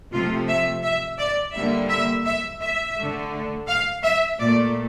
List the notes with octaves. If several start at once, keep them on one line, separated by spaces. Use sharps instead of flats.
C3 F3 A3 F4
E5
E5
D5
D3 G3 A#3 E5
E5
E5
E5
D3 A3
F5
E5
A#2 A3 D5